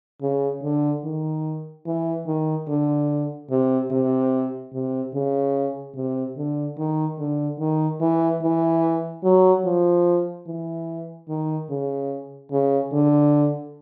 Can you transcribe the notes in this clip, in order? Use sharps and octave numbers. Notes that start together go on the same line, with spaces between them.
C#3
D3
D#3
E3
D#3
D3
C3
C3
C3
C#3
C3
D3
D#3
D3
D#3
E3
E3
F#3
F3
E3
D#3
C#3
C#3
D3